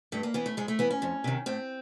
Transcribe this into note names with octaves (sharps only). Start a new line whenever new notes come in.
G2 A3
A#3
E3 B3
A3
G#2 G#3
A3
E3 B3
C#4
F2
C3 D#3
A2 C4